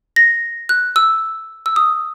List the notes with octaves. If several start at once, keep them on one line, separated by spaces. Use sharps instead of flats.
A#6
F#6
E6
E6
D#6